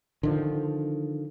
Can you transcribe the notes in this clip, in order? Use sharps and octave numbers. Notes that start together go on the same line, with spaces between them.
D3 D#3 F3